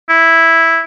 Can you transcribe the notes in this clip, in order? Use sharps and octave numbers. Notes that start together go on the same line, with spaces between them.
E4